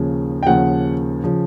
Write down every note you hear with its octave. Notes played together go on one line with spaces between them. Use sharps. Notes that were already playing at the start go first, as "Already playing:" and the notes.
Already playing: D#2 C#3 F3
G5
D#2 C#3 F3 F#5
C#3 F3